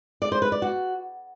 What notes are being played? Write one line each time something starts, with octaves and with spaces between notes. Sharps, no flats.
D5
C5
B4
D5
F#4